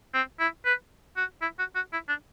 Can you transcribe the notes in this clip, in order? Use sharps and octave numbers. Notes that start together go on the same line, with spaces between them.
C4
E4
B4
F#4
E4
F#4
F#4
E4
D4